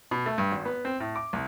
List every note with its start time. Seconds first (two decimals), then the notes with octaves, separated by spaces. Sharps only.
0.11 B2
0.26 A3
0.38 G2
0.51 G#1
0.65 B3
0.85 C4
1.00 A2
1.16 D6
1.33 C2